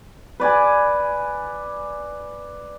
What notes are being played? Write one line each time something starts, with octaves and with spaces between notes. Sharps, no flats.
B4 D5 G#5